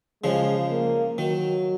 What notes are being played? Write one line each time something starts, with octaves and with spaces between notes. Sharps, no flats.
C#3 F3 G#3
A#3
D#3 F#3